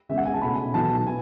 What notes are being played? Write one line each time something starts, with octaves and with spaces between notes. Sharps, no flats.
C#3 G#3 B3 E5
F#5
G#5
A5
B2 A3 C#4 B5
B2 F#3 B3 A5
B3 G#5